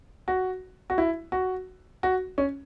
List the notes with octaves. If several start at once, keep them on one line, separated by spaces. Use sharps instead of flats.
F#4
F#4
E4
F#4
F#4
C#4